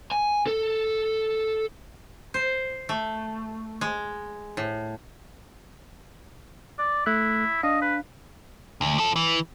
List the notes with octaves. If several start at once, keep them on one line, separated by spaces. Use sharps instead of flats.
G#5
A4
C5
A3
G#3
A2
D5
A3 E4 F#6
D4 D#5 F5
B4
D2
F3 A4
E3